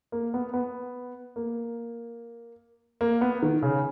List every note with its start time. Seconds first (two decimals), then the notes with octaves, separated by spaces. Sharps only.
0.12 A#3
0.34 B3
0.54 B3
1.36 A#3
3.01 A#3
3.21 B3
3.42 D#3
3.62 C#3